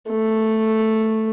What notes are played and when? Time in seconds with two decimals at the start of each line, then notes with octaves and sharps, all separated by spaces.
0.10 A3